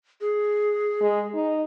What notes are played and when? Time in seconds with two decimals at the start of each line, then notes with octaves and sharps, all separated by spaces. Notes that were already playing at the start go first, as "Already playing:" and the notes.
0.21 G#4
1.01 G#3
1.34 D#4